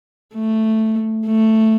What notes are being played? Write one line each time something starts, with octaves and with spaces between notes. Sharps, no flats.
A3
A3